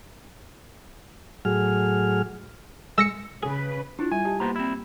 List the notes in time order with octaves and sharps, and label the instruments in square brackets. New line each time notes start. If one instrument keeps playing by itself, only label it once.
[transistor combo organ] A2 F#3 G#4 F6
[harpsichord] G#3 [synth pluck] E6 A#6 C#7
[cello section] C#3 B4 [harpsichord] G#4
[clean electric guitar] D4 [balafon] E4 F4
[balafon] G3 [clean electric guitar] G#5
[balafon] G4 D#5 A5
[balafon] A#3 [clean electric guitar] B3 C5 A#5
[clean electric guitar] C4 E4